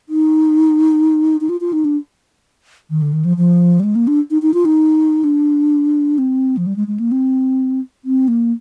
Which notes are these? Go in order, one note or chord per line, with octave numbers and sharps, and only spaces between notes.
D#4
D#4
F4
F4
D#4
D4
D#3
D3
D#3
F3
F3
G3
G#3
A#3
D4
D#4
D#4
F4
D#4
D4
C4
F3
G3
G#3
G#3
A#3
C4
C4
A#3